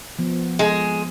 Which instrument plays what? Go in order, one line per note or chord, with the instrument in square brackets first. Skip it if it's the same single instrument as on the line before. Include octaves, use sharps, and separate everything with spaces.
[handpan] F3 B3
[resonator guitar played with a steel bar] G#3 G#4